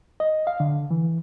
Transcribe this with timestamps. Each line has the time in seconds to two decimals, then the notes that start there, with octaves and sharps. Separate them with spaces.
0.20 D#5
0.47 F5
0.60 D3
0.91 E3